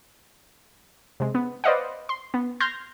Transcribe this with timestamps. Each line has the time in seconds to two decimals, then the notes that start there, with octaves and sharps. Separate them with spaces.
1.20 C3 G#3
1.35 B3
1.64 B4 C5 D5 D#5 F5 F#5
2.09 C6
2.34 B3
2.60 C6 F6 G6 G#6 A#6